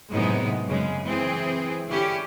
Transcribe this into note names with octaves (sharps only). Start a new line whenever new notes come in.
F#2 A2 C3 G#3 B3 D#4
F#2 C#3 G#3
E3 C4 G#4
D3 C#4 E4 G4